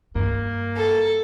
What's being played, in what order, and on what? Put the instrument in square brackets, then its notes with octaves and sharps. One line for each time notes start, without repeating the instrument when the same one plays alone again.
[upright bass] G2 [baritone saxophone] A#3
[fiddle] A4